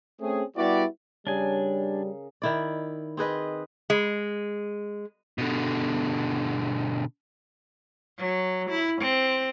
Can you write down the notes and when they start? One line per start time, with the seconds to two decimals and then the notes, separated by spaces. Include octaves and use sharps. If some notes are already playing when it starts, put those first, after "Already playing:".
0.21 A3 C4 C#4 G#4
0.57 G3 B3 E4 F#4 G4 D5
1.27 C#3 G3 D4 G#4 A#4 G#5
2.42 D#3 E4 D5
3.17 C4 G#4 B4 D#5
3.90 G#3
5.38 B2 D3
8.18 F#3
8.70 E4
9.01 C4